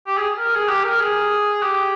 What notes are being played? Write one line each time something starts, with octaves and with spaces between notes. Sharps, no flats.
G4
G#4
A#4
G#4
G4
A#4
G#4
G4